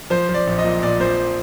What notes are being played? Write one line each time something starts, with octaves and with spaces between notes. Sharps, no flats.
F3 C5
F3
D5
A#1
D#5
A#2
A#2 D5
F3 C5